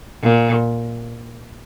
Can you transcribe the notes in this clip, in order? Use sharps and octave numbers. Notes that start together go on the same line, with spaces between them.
A#2